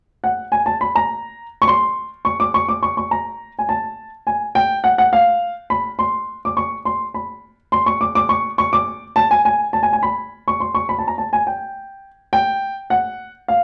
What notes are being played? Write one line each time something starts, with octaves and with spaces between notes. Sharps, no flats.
F#5
G#5
A5
B5
A#5
C#6
C6
C#6
D6
C#6
D6
C#6
C#6
A#5
G#5
A5
G#5
G5
F#5
F#5
F5
B5
C6
D6
C#6
C6
B5
C6
C#6
D6
D6
C#6
C#6
D6
A5
G#5
G#5
A5
G#5
G#5
B5
C#6
C6
C#6
B5
A5
A#5
A5
G#5
G5
G5
F#5
F5